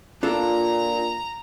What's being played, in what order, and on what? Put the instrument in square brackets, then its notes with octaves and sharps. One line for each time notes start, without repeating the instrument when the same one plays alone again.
[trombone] A#2 [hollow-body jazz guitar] D4 F4 A4 [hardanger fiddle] A#5